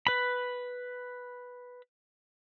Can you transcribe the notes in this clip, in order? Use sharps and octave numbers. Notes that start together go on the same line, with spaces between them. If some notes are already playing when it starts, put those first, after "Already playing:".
B4 B5